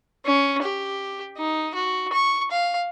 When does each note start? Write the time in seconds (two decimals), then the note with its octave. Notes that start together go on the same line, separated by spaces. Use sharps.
0.25 C#4
0.62 G4
1.37 D#4
1.74 F#4
2.12 C#6
2.51 F5